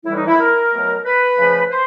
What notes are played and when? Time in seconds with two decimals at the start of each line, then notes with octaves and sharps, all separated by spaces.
0.05 A2 E3 G3 E4
0.16 D#4
0.28 E4
0.38 A#4
0.72 B2 F#3 A3
1.05 B4
1.37 C#3 F3 A3
1.71 C5